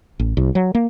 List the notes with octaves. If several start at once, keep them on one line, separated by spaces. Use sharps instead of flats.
A1
C2
F#3
A#3